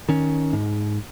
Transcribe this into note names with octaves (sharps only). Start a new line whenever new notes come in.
D#3 C#4
G#2